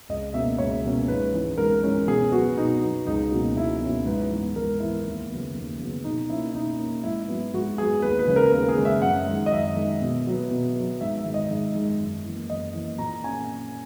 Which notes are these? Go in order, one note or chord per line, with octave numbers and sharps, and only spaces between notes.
C#2 D#5
B2 A#3 C#4 E5
C#2 C#5
B2 A#3 C#4
G#2 B4
E3 G#3 C#4
G#2 A#4
E3 G#3 C#4
B2 G#4
F#3 B3 F#4
B2 D#4
F#3 B3
C#2 D#4
B2 F#3 A#3 C#4
C#2 E4
B2 F#3 A#3 C#4
G#2 B4
E3 B3
G#2 A#4
E3 B3 E4
D#2
C#3 F#3 B3
D#2
C#3 F#3 B3
B2 D#4
A#3 C#4 E4
B2 D#4
A#3 C#4
G#2 E4
F#3 B3
G#2 F#4
F#3 B3 G#4
D#2 B4
B4
C#3 G#3 C#4
A#4
D#2 A#4
G#4
C#3 G#3 C#4
E5
F#2 F#5
D#3 G#3
D#5
F#2 E5
D#3 G#3
B2
F#3 B3
B2
F#3 B3
G#2 E5
E5
D#3 G#3
D#5
G#2
D#3 G#3
F#2
E3 A#3
F#2 D#5
E3 A#3
A#2 A#5
A#3 C#4 G#5